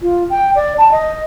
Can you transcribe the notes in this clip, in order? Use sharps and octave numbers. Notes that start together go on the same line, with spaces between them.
F4
G5
D5
A5
D#5